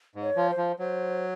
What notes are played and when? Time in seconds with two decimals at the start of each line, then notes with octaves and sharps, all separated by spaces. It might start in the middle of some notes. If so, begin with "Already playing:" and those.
0.15 G#2
0.22 C#5
0.36 F3
0.50 C5
0.57 F3
0.79 F#3 C5